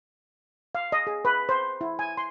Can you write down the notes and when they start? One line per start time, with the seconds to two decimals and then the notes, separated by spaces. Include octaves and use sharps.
0.75 F5
0.92 D#5
1.07 G#4
1.25 B4
1.49 C5
1.81 E4
1.99 G#5
2.17 C6